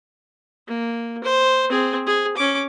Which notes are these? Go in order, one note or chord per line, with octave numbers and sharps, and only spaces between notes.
A#3
C5
C4 G#4
G#4
C#4 D6